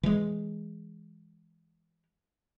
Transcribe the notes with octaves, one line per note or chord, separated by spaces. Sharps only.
E3 G#3